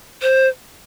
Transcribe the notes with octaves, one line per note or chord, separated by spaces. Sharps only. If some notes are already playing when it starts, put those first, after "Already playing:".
C5